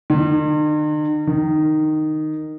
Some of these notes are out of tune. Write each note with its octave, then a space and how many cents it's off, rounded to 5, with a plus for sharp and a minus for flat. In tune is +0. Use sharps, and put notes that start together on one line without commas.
D#3 -45
D#3 -10